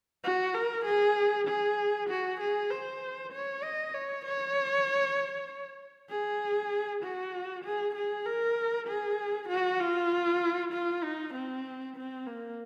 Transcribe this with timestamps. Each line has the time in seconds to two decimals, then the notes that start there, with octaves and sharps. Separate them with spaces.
0.24 F#4
0.54 A#4
0.85 G#4
1.47 G#4
2.09 F#4
2.40 G#4
2.70 C5
3.32 C#5
3.63 D#5
3.94 C#5
4.25 C#5
6.09 G#4
7.03 F#4
7.65 G#4
7.95 G#4
8.26 A#4
8.88 G#4
9.48 F#4
9.80 F4
10.73 F4
11.03 D#4
11.34 C4
11.96 C4
12.26 A#3